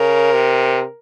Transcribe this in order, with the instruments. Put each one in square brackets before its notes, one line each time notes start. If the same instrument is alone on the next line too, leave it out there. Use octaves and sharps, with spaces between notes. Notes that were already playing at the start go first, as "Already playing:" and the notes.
Already playing: [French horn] C#3 [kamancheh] A#4
[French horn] C3